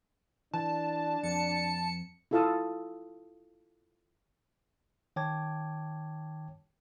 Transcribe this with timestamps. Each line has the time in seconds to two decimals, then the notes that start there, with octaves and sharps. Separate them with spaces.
0.54 E3 D4 A5
1.23 F2 C#7
2.31 E4 F4 A4 F5 A5 D#6
5.16 D#3 C#5 G5 A5 D6 G#6